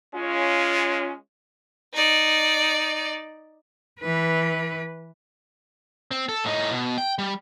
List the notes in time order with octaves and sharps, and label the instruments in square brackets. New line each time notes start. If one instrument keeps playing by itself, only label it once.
[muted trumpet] G#3 [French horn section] C#4 F4
[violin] D#4 D5
[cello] E3 B4
[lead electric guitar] C4
A4
A2 D#4
B2
G5
G3